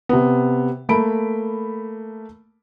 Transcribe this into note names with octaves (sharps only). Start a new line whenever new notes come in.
C3 B3
A3 A#3 B5 D7